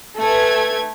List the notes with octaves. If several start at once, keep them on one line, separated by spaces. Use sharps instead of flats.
A3 D4 B4 G#5 G#6